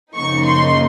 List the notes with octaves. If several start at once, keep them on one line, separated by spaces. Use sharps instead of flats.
F#2 C#3 F3 A#3 D#4 C#6
C6